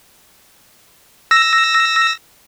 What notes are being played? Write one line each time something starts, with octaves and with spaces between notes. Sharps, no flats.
E6 A#6